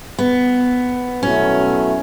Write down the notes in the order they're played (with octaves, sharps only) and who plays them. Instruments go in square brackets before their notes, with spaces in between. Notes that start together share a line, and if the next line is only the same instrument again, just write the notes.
[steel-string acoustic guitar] B3
[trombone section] B2 F#3 A3 E4 [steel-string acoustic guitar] C#4